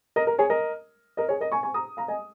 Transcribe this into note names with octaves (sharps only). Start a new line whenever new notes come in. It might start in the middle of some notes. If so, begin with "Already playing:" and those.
A#4 D#5
A#4
G#4 C#5
A#4 D#5
A#4 D#5
G#4 C#5
A#4 D#5
G#5 C#6
G#5 C#6
A#5 D#6
F5 A#5
D#5 G#5